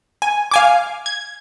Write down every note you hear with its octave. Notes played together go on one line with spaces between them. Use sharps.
G#5
F5 G#5 D6
G#6